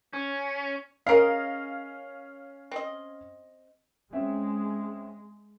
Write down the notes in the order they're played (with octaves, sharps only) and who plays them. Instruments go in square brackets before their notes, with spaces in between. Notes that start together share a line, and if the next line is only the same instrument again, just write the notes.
[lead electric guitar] C#4
[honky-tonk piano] C#4 F5 [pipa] G#4 A#4 D#5
[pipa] C4 D#5
[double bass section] G#3 [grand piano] C4 C#4 E5